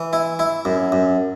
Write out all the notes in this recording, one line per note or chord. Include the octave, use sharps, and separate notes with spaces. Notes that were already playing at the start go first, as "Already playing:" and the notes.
Already playing: E3
E4
E4
F#2
F#2